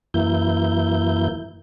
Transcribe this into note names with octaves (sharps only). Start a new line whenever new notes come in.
F#2 E3 A#3 E4 G6